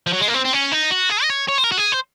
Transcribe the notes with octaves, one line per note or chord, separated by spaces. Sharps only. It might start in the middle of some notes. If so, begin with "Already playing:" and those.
F3
F#3
G#3
A#3
C4
C4
C#4
D#4
F#4
G#4
D#5
C#5
C#5
C5
A#4
F#4
G#4
C5